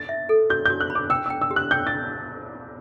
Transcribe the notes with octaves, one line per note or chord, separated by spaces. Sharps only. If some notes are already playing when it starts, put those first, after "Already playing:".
Already playing: A6
E5
A4
F#4 G6
F#4 G6
F#6
B5
D6
G5 E6
G5 E6
E6
G4
F#6
G5 G6
A6